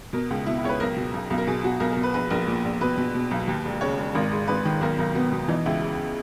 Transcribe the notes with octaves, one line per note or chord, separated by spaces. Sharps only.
B2 A#4
C#2
B2 E4
E4
C#2 C#5
B4
B1 A#4
B2
B1
B1
A#4
B2 G#4
B2 F#4
B1 A#4
B2 A#4
B4
A#1 B4
A#1 A#4
A#2
A#1
B2 B4
B2
B2
B1
D#2
E1
C#3 C#5
E1
G#1 A#4
G#2
G#1 B4
D#3
B1 A#4
B1 A#4
B2 B3
B2
E3 D#4
C#2 E4
C#3